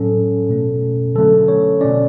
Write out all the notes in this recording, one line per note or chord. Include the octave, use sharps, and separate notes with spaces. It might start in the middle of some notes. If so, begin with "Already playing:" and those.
Already playing: A2 F#3 C#4 A4
B2 A3 C#4
D3 F#3 A3 C#4 A4
C#5
B2 A3 C#4 D5